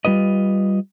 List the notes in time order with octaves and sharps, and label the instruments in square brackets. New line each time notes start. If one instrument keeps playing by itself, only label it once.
[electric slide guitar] G3 F4 B4 D#5